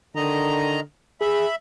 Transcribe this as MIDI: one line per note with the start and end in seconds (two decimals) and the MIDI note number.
0.16 0.80 50
0.16 0.80 51
0.16 0.80 75
0.16 0.80 82
1.21 1.46 68
1.21 1.55 76
1.21 1.55 83